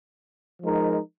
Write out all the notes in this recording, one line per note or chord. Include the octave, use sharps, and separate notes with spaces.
F3 G#3 D#4 A#4